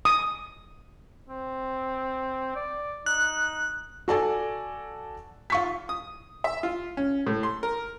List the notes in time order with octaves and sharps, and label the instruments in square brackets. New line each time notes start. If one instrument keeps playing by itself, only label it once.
[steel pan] D#6
[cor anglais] C4
D5
[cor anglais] D#4 [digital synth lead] F#6
[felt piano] F#4 A4 D5 G#5
F4 C#6 B6
[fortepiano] D#6
E5
F4
C#4
A2
C6
A#4